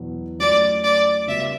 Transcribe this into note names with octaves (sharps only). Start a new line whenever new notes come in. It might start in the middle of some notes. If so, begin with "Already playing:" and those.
Already playing: E2 B2 F#3 B3
F#3 A3 C#4 F#4 C#5 D5
D5
C#3 G3 B3 F#4 E5